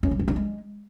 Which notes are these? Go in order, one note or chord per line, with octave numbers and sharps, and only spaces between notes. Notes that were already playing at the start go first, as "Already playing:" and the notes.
C#4
G3
C4
D4
G#3